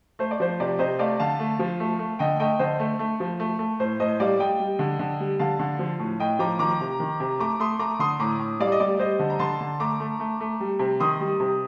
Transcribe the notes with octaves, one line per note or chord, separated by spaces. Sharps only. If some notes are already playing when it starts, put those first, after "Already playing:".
A3 C5
D5
F3 C5
C3 D5
C3 C5 D#5
A3 D5 F5
D3 F5 A5
A3
F3
A3
A3
D3 D#5 G5
A3 D#5 G5
D3 C5 D#5
A3
A3
F3
A3
A3
A2 C5
A2 C5 D#5
G3 D5 F5
G3 D#5 G5
G3
D3
D3
G3
D3 F5 A5
D3
F3
A2
A2 D#5 G5
F3 A#5 D6
D#3 A#5 D6
C3
D#3
C3
A3 A#5 D6
A3 C6 D#6
A3 A#5 D6
D3 C6 D#6
A2 A#5 D6
A2
G3 D5 F5
D#5
G3 D5
G3 C5 D#5
D3
A#5
D3 A5 C6
D3
A3 A#5 D6
A3
A3
A3
G3
C3
D#3 C6 D#6
G3
C3